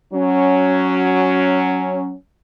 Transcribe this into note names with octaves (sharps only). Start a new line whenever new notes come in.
F#3 C#4